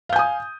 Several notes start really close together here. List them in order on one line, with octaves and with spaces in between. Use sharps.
F5 G6 G#5 D#6